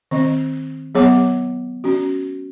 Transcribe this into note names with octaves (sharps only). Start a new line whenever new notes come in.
D#3 C4 D#5
F#3 B3 G#4 C#5 F#5 D6
C#4 F#4